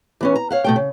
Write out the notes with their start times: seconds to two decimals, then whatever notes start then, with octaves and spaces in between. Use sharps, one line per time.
0.21 E3 B3 C#4
0.36 A#5
0.51 C#5 F5 F#5
0.64 B2 A3 G5
0.76 C#3